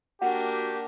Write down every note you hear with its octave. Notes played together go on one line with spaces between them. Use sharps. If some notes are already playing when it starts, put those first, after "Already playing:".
A#3 D4 F#4 G4 F#5